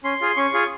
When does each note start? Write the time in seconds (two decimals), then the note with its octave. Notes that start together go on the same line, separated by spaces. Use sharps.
0.04 C#4 C6
0.21 F4 G#4
0.37 C#4 C#6
0.54 F4 G#4